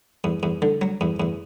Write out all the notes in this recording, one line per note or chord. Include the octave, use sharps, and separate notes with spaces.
E2
E2
D3
F#3
E2
E2